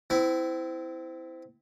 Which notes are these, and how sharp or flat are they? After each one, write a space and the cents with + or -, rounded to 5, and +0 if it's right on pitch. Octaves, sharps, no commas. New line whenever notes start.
C4 -25 E4 +0